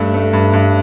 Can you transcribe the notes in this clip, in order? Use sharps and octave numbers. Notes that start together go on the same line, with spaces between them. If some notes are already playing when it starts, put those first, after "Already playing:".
Already playing: G2 A3 E5
A3
G2
G2